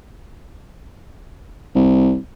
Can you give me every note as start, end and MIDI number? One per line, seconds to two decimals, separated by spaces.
1.75 2.17 36